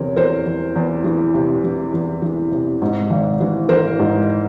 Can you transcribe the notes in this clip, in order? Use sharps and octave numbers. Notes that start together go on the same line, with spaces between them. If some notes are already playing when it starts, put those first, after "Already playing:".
Already playing: E2 C3 A#4 C#5
E2 A#4 C5
E2
E2
E3
C3
E3
E2
E3
C3
G#2
G#1
E3
E3 A#4 C5
G#2